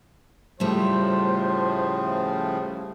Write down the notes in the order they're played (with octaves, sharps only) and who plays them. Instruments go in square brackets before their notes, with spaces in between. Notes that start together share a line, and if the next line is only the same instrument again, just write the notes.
[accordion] A2 C#3 F3 [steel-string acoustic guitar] G3 A3 [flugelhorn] C5